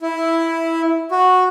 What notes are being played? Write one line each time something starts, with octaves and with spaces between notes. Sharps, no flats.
E4
F#4